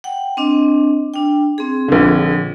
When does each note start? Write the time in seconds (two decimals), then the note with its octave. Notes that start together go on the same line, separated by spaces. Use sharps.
0.04 F#5 G5
0.37 C4 D4 D#5
1.14 D4 G5
1.58 C4 G#4
1.88 A#1 D3